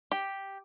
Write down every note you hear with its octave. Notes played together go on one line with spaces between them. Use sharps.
G4